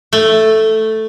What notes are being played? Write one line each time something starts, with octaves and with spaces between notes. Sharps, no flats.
A3